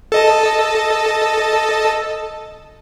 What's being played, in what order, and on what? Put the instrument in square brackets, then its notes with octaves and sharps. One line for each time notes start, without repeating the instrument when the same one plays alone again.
[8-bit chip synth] A4 D#5 A5